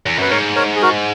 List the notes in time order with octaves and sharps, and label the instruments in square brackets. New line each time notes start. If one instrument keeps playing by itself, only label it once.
[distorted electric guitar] E2
[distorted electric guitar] F#2 [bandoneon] B4
[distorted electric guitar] G#2 [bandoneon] A#4 C#5
[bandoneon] A#4 C#5
G#4
F#4 A#4